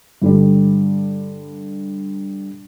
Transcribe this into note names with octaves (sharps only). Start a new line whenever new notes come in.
G2 D3 G3